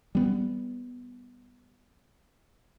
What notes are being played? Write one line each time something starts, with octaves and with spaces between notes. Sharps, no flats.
G3 B3